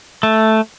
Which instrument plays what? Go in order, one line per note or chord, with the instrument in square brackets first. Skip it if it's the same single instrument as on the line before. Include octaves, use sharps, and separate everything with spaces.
[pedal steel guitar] A3